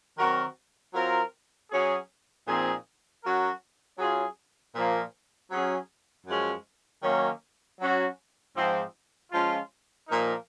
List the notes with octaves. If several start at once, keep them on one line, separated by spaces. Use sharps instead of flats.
D#3 F#3 C4 F#4 A#4
F#3 C4 F4 A#4
F#3 C#4 G#4
A#2 F3 C4 D#4 G#4
F#3 C#4 F#4 A#4
F#3 C#4 F4 G#4
A#2 F3 A#3
F#3 C#4 G#4
F#2 F3 G#3 C#4
D#3 F#3 A#3 C#4
F#3 C#4 F#4
G#2 F3 C4
F3 G#3 C#4 F4
A#2 F3 A#3 D#4 A#4